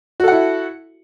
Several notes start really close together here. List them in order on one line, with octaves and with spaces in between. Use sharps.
F#4 A4 F#5 E4